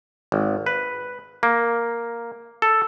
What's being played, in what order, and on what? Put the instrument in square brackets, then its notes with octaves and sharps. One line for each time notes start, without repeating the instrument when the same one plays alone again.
[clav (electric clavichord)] G#1
B4
A#3
A4